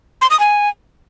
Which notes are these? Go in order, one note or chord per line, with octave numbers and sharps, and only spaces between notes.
C6
D#6
G#5